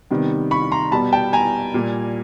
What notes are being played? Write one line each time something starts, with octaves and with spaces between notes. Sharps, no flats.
C3 D#3 G3 B3
B5 C#6
A#5 C6
B2 G3 B3 A5 B5
G5 A5
G#5 A#5
A#2 G3 A#3